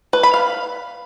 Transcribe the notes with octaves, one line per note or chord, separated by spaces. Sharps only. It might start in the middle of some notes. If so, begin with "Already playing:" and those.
B4
B5
F5